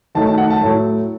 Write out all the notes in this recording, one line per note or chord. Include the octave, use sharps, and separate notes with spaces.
D#3 F#3 A3 D#4 A5
A5
F#5
A5
A2 F#3 A3